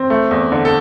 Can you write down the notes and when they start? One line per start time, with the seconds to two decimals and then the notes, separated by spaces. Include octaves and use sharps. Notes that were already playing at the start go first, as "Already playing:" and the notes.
Already playing: C4
0.10 A3
0.31 E2
0.52 D3
0.65 A4